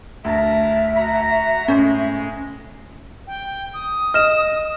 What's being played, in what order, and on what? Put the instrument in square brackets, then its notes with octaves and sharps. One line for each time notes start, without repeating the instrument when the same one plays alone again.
[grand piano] D2 [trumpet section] A#4 A5 A#5 [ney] E5
[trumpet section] F#4 A#5
[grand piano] A2 [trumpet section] G#3 [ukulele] C#4 C5
[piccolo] G5
D#6
[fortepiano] D#5 [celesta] F6 E7